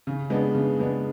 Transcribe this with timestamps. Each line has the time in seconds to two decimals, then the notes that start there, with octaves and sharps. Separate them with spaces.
0.07 C#3
0.30 G#3 B3 D4
0.55 C#3
0.79 G#3 B3 D4